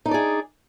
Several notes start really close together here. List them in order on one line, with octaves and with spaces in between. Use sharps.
D#4 D4 D5 G#4